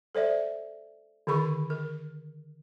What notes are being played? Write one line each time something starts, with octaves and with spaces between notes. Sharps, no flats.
A4 C5 D5 E5
D3 D#3 G#4 B5 C#6
A#4